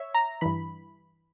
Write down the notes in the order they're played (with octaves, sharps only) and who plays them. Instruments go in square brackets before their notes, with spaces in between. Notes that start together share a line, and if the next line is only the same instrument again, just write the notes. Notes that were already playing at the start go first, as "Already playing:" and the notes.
Already playing: [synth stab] C#5 E5
A#5
G2 E3 B5